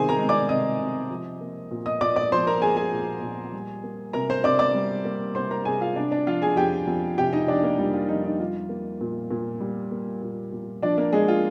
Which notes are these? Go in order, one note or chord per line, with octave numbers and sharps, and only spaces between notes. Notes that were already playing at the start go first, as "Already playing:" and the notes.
Already playing: C3 D#3 G3 C4 G#4 C5 G#5
A#4 A#5
G#3
D5 D6
C3 D#5 D#6
C3
F3
A#3
A#2
D#5 D#6
A#2 D5 D6
D5 D6
F3 C5 C6
A#4 A#5
A#3 G#4 G#5
G#4 G#5
A#2
A#2
G3
A#3
C3 A#4 A#5
C5 C6
C3 D5 D6
D5 D6
G3
A#3
C3 C5 C6
A#4 A#5
C3 G#4 G#5
F4 F5
C3 D4 D5
D4 D5
F3 F4 F5
G#4 G#5
F2 G4 G5
F2
C3 G4 G5
D#4 D#5
F3 D4 D5
A#3 A#4
F2 G3 G4
F4
F2 D#4
D#4
G3 F4
A#3
A#2
A#2
G3
A#3
A#2
A#2
F3 D4 D5
A#3 A#4
G#3 A#3 G#4
F4